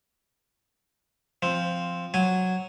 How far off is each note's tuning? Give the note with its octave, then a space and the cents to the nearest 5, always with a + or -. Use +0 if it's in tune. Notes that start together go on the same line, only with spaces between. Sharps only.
F3 +0 C4 +0
F#3 +0 G#5 +0